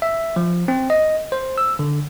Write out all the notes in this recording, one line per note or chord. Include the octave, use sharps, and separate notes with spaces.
E5
F3
C4
D#5
C5
E6
D3